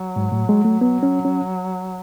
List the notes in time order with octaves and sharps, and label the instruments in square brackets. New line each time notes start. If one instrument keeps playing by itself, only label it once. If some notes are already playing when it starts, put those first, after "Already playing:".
Already playing: [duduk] F#3
[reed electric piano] G#2
A2
G#3
A3
[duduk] F#3 [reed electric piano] B3
[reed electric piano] C#4
C#4